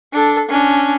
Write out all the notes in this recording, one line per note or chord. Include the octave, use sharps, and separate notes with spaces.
D4 A4
C#4 D4